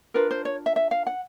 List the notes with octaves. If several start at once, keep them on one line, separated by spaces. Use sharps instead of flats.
D4 F4 A#4 B4
C5
C#5
E5
E5
F5
F#5